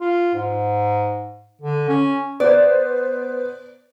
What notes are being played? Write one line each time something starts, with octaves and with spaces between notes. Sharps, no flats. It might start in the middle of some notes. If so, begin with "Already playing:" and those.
F4
G#2
D3
C#4
B3 C5 D5